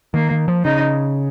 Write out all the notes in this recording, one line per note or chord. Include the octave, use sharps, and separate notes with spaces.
D#3 A#3
D#3
F3
C#3 D#4